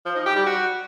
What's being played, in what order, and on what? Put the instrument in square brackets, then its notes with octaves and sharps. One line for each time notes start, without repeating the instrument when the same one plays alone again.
[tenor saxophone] F3
D#4
G4
G3
F#4